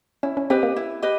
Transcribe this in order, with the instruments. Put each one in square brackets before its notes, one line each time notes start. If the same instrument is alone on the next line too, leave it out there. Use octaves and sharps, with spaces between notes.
[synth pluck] C#4 [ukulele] E4
[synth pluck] C#4
[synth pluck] C4 [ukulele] G4 B4 D#5
[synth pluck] A#3
[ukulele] E4
G4 B4 D#5